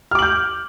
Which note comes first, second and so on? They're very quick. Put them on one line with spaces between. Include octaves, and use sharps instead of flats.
F6 D6 F#7 G6